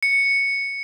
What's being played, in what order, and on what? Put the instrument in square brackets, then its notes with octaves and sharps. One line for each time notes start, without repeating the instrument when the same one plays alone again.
[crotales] C#7